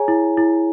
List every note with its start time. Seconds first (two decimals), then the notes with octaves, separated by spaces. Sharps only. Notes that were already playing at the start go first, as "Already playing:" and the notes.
Already playing: G#4 C#5 G#5 A#5
0.08 E4
0.37 E4